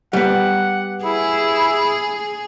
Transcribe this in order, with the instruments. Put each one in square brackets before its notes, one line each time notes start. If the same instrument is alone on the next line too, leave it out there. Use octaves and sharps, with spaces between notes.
[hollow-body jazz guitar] G3 B3 [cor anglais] F#5
[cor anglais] E4 [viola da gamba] G#4